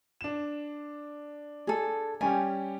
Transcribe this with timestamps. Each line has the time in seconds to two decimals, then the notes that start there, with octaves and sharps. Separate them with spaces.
0.21 D4 E7
1.67 G#4 A4
2.21 G3 C#4 G4 G#5